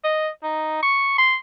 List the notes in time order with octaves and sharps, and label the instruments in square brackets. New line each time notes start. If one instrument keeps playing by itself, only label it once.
[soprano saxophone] D#5
D#4
C#6
C6